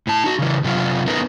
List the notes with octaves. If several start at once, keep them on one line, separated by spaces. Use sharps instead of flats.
A2 A5
D#4 F#4
C#3 E3
C3 F#3 F4
A3 B3 D#4 A#4 B4